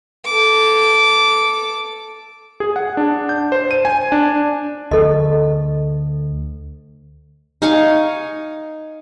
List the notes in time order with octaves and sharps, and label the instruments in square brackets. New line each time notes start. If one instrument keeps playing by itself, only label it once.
[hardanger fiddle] A4 D6
[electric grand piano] G#4
F#5
D4
G6
C5
D#7
G#5
D4
[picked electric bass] D2 [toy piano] A4 D#5
[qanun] D#4 F5 G#5 C#6